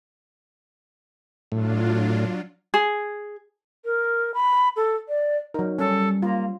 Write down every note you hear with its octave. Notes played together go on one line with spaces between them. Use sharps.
A2 F#3 D4 F4
G#4
A#4
B5
A4
D5
F#3 D#4 A#4
G3 C#4 A4
A#3 F4